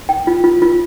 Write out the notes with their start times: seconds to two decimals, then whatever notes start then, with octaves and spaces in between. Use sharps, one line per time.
0.09 G5
0.27 F4
0.44 F4
0.62 F4